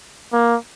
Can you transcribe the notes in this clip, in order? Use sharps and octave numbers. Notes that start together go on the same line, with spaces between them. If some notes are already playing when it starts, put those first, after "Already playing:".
A#3